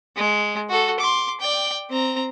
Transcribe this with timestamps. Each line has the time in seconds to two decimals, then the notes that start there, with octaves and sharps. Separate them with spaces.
0.16 G#3
0.70 F#4 A4
1.00 C6 D6
1.40 D5 G5
1.90 C4 A#5